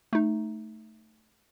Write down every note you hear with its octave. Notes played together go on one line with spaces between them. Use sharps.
A3 D#4